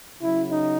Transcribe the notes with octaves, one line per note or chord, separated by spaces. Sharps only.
C#3 F#3 E4
D#4